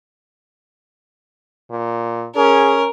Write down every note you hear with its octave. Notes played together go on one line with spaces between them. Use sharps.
A#2
C#4 G#4 A#4